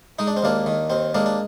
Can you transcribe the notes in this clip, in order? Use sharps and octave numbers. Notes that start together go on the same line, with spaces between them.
G#3 D#4
D4
C4
D#2 A#3 D4
D#3
D#2 C4
G#3 A#3 D4
D4